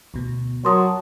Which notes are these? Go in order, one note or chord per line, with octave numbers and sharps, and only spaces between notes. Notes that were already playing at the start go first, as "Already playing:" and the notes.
D2 B2
F#3 A#4 A5 C6 D#6